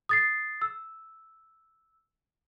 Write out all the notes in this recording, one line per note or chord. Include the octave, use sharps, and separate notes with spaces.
D#6 A6 C7
E6